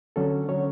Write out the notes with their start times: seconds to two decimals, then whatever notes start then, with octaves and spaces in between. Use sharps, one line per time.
0.16 D3 F#3 C#4 A4
0.49 D3 F#3 C#4 C#5